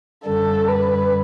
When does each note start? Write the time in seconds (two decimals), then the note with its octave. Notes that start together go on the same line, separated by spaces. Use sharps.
0.25 F#2 D3 G3 A4
0.68 B4